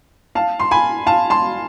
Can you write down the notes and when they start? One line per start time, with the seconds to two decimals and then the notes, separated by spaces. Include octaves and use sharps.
0.35 F5 A5
0.60 C6
0.71 G#5 B5
1.07 F5 A5
1.30 A5 C6